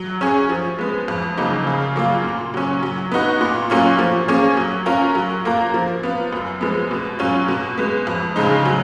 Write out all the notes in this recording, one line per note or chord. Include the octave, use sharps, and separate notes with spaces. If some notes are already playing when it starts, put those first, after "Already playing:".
Already playing: F#3
C#4 G#4
F3
G#3 B3
F2
C#3 F#3 A#3 D#4
C#3
F#3 A#3 F4
A#2
F#3 C#4
F#3
B3 D#4 F#4
A#2
F#3 A#3 C#4 F4
F3
A#3 C#4 G#4
F#3
C#4 F4 A#4
F#3
A#3 F4 A#4
F3
B3 F4
F#2
F3 G#3 B3
B2
F#3 C#4 F4
B2
G#3 B3
F2
C#3 G#3 D#4
F#3